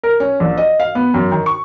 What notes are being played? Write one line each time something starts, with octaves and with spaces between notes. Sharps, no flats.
A#4
C#4
A#1
D#5
F5
B3
F#2
D#3
C#6